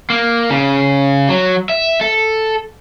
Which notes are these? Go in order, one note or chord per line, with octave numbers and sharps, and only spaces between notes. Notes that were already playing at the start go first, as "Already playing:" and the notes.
A#3
C#3
F#3
E5
A4